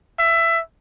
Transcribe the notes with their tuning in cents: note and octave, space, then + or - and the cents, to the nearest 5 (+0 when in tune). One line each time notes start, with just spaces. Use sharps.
E5 +20